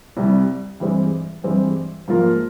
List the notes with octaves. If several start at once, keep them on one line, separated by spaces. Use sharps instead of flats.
C2 C3 G3
G2 E3 G#3 C4 G4
G2 E3 G#3 C4 G4
G#2 F3 A#3 F4 A#4